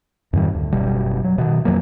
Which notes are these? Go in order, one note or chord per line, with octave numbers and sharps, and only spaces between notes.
F2 G#2 D#3 G3
D2
F#1 B2 G3
F#3
B2 D#3
F2 F3 F#3 A#3